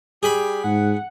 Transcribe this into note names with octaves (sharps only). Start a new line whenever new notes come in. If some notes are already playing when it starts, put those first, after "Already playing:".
G3 G4 G#4 B5
G#2 F#5